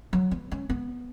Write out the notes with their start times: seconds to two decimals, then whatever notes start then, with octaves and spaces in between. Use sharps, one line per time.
0.13 F#3
0.31 B3
0.51 C#4
0.70 B3